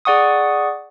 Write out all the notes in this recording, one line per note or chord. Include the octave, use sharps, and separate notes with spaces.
G#4 D5 F#5 C#6 D#6